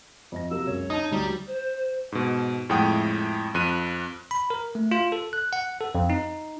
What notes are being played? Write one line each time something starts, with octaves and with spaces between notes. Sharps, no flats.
F2 D#5 A#6
C3 F#3 A#3 E6
C#2 F#2 C#5
D#4 A5 D#6
D2 F#3 G3 D#4 D#6
C5
G#2 B2
F2 A2 G#3 F#5 G5 D#6
F2 F#6 D#7
B5
A#4
A3
F4
A4
F#6
F#5
A4
F2
D#4